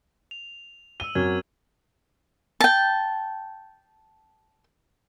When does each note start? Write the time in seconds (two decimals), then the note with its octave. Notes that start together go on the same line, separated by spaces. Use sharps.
0.31 F7
1.00 E6 D#7 G7
1.15 F#2 C4 F#4 A#4 G#6
2.60 G5 A5